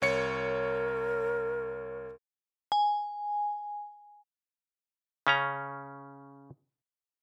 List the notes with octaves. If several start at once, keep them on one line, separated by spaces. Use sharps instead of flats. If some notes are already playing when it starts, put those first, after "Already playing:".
C2 A#4 C#5 C#7
G#5
C#3 C#4 A#5